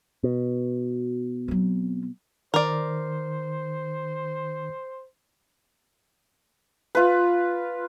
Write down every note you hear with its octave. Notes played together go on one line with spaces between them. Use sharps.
B2
F#3 C4
D#3 A#4 C5 D5
F4 B4